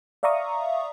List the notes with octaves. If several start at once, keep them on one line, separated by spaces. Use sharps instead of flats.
D5 E5 F5 A#5 C#6 D#6